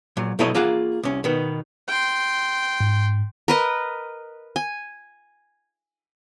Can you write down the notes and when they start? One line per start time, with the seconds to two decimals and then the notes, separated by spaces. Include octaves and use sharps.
0.17 A#2 F#3
0.39 B2 F#3 E4 A4 C#5 D#5
0.55 A#3 F4 G#4 F5 F#5
1.03 C2 C#4
1.24 B2 D#3 B3
1.88 G5 C6
2.81 G#2
3.48 A#4 B4 D#5
4.56 G#5